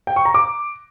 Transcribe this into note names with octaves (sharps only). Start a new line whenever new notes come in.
G5
C#6
A#5
D6